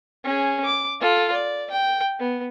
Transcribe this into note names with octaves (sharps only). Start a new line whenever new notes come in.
C#4 G#4
D6
F4 A4
D5
G5
B3